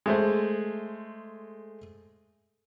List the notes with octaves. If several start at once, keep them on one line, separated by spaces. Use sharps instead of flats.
G#3 A3 C5